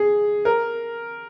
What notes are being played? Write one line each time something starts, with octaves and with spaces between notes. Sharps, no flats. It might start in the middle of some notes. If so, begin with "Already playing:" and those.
Already playing: G#4
A#4